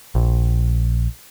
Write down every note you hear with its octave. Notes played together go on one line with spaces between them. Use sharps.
A#1